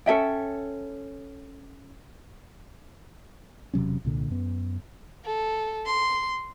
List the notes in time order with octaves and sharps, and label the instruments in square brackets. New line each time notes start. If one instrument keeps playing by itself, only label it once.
[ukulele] C#4 A4 E5 G5
[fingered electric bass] E1 C3 F#3 C#4
C2 A#2 D3
F#2 B3
[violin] A4
C6